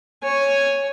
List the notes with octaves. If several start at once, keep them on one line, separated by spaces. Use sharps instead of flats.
C#5 G#5